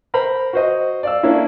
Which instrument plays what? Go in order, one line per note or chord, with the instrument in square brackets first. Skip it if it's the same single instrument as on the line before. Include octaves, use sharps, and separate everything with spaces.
[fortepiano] A#4 C5 A#5 B5
F#4 C5 D#5
D5 F5 E6
A#3 C#4 D4 E4